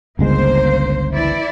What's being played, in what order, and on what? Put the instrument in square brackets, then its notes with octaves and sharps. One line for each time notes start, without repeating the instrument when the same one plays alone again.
[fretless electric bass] G1 C#2 G#3 [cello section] A#3 C5
[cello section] E3 E4 D5